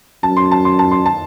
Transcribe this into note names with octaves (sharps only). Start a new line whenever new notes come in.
F#2 A5
C6
A5
C6
A5
C6
A5